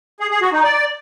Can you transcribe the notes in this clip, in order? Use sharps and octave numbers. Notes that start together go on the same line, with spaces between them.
G#4
G#4
F#4
D#4
D5